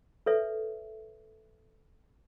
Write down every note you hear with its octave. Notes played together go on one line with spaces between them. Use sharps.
A4 B4 C#5 E5